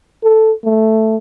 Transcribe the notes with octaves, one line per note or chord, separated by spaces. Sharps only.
A4
A3